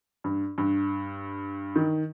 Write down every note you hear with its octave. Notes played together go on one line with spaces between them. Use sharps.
G2
G2
D#3